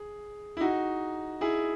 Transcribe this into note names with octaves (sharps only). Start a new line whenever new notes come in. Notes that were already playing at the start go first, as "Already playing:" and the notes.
Already playing: G#4
E4
D#4 F#4
E4 G#4